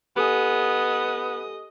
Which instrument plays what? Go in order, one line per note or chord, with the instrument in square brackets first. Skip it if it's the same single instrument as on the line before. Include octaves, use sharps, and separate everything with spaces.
[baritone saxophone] B3 [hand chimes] G4 A4 G#5 [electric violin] D#5 D#6